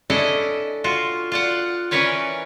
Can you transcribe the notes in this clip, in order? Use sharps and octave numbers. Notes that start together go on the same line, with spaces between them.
C#4 D4 E4 A4 D5 D#5
F4 F#4
F4 D5 F#5
E3 C#4 A#4 B4 C#5 D5